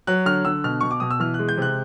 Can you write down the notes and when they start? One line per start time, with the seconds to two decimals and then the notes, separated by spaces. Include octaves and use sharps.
0.07 F#3 F#6
0.26 D3 F6
0.45 D3 E6
0.64 B2 F6
0.81 B2 C#6
0.91 D6
1.00 B2 D#6
1.11 E6
1.20 E3 F6
1.34 F#6
1.39 G#3
1.49 G6
1.58 C3 F#6